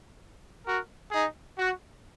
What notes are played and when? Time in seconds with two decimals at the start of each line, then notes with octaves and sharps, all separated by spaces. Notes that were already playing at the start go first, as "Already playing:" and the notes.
0.64 F#4 A#4
1.10 D#4 G#4
1.56 F#4